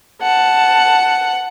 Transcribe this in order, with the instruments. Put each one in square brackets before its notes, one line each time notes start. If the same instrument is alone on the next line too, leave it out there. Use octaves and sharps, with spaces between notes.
[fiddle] F#5 [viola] A5